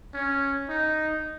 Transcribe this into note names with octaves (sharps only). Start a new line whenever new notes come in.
C#4
D#4